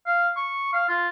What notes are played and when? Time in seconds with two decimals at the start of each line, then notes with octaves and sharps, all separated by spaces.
0.06 F5
0.37 C#6
0.73 F5
0.89 F4